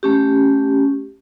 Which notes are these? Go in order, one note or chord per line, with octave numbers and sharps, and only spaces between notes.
A3 C#4 G4